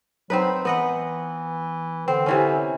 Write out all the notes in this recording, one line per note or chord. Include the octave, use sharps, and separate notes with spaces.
F#3 C4 D#4 B4
E3 B3 D#5 F#5
D3 C4
C3 E3 C#4